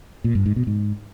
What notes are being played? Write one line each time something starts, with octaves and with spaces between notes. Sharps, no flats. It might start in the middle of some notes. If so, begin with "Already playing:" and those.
A#2
G2
G#2
B2
G#2